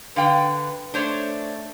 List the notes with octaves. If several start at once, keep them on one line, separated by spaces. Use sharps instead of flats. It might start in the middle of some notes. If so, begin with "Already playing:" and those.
D3 B4 F5 G5
A3 D4 C5 C#5